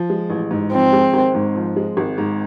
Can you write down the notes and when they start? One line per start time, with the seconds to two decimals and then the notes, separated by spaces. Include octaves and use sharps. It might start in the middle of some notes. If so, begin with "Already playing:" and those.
Already playing: F3
0.10 G#3
0.30 A1
0.51 G#2
0.71 F3 C4
0.93 G#3
1.14 G#1
1.35 G#2
1.55 F3
1.76 G#3
1.97 G#1
2.18 G#2